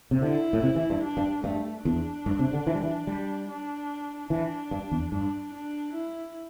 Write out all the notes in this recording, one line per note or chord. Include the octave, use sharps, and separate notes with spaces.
C3
D3 E4
A2
C3
E3
G2
D4
G2
G2 A3
E2 D4
G2
C3
D3
E3
G3
E3
G3
D4
E3 D4
G2
E2
G2 D4
D4
E4